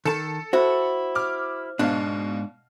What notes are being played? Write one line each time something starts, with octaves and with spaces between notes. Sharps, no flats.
D#3 A4 A5
E4 F#4 C5
D6 F6
G#2 B2 D4 F5